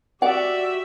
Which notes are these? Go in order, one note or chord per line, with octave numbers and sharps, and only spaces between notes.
F#4 G4 D5 E5 F#5